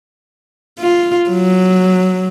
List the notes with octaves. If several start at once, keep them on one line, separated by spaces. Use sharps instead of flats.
F4
F#3